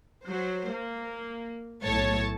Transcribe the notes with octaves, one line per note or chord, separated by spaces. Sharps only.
F#3 C5
A#3
B1 A2 A3 C#5 A5